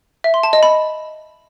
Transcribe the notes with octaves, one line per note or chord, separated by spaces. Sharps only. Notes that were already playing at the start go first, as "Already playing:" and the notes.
E5
C6
A5
D#5
B5